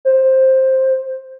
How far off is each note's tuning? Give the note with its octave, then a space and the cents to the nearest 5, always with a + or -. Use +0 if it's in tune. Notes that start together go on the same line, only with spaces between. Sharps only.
C5 +10